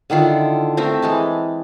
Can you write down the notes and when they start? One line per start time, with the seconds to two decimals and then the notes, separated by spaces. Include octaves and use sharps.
0.10 D3 D#3 E4 F4
0.77 A3 C4 A#4 E5
1.02 E3 G#3 A5